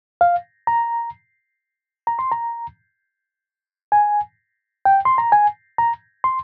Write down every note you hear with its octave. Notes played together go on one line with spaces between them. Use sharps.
F5
A#5
A#5
C6
A#5
G#5
G5
C6
A#5
G#5
A#5
C6